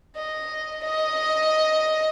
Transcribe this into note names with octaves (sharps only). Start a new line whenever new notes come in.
D#5
D#5